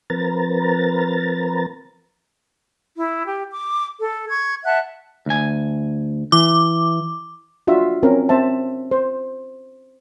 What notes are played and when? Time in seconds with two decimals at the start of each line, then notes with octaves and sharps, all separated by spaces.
0.10 F3 C4 A#4 B4 A#5 A6
2.96 E4
3.26 G4
3.51 D6
4.00 A4
4.29 C#6 G#6
4.65 E5 F#5 A5 F#6
5.26 D2 G#5
6.32 E3 D6
7.67 D4 F4 F#4 E5
8.03 C4 C#4 A#4
8.29 C4 C5 E5 A5
8.91 C5